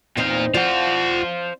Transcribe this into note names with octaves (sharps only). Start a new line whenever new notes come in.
E2 A#2 C4 D#4 F5
F4 C5 D5 F5 F#5